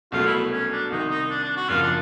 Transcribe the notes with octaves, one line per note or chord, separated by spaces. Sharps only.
C2 B2 F#3 A3 F4
E4
C#4
D4
C2 C3 D#3 D#4
D#4
D4
D4
F#4
G#1 F#2 C#3 F3 A#3 F4
D4